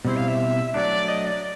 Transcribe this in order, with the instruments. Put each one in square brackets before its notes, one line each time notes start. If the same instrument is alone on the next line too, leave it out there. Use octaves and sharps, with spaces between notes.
[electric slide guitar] B2 G3 C4 E4 [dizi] C5
[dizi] F5
E5
[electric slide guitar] F#3 A3 D4 [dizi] D5
[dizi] D#5
D5